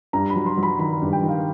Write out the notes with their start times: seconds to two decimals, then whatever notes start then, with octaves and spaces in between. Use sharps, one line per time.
0.13 G2 A#5
0.30 B5
0.36 F#3
0.46 C6
0.57 F#3
0.63 B5
0.79 D#3 B5
1.02 G2
1.13 G5
1.23 D#3
1.29 F5